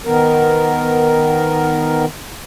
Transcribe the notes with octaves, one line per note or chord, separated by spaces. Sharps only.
D#3 B3 A#4